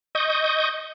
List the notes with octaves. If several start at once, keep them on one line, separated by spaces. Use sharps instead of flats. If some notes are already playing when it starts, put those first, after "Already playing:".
D#5 C#6 D#6 G6